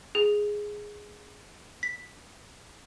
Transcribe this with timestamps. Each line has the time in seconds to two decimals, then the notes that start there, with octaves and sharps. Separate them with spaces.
0.15 G#4
1.83 B6